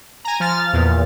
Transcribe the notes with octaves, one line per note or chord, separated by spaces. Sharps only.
G#5 A#5
F3 F6 A6
E2 A#2